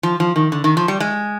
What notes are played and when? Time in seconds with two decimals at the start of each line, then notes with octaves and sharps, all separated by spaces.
0.03 F3
0.20 F3
0.36 D#3
0.52 D3
0.64 D#3
0.77 F3
0.88 G3
1.00 G#3